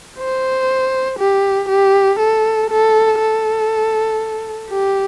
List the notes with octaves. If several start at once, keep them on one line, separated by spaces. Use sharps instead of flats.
C5
G4
G4
A4
A4
A4
G4